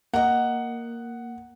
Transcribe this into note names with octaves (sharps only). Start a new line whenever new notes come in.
A#3 A#4 D#5 F#5